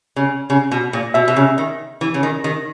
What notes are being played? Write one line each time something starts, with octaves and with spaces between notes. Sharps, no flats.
C#3
C#3
B2
A#2
B2 E5
B2
C#3
D#3
E3
C#3
D#3
D#3